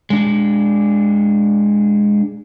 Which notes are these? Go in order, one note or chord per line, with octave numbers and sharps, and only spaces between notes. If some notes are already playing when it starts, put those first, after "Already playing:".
G#3 D4